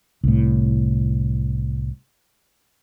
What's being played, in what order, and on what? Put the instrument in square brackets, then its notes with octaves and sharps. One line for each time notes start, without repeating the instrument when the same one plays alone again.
[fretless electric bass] C2 A2